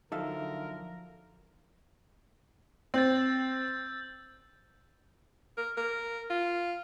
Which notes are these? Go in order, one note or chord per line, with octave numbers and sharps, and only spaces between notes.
D3 F3 F#3 D#4 A4 A#4 E5 F5
C4 E6 G6 A6
A#4
A#4
F4